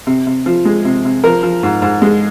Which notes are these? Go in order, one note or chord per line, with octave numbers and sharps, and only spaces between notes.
C3
C3
F3
G#3
C3
C3
F3 A#4
F3
G#2
G#2
G#3